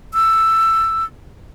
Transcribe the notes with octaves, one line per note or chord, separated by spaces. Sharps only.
E6